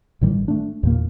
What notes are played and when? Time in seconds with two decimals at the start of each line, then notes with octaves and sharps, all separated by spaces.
0.21 A1 A2 D#3 G3
0.48 A3 D4
0.83 E2 A#2 A#3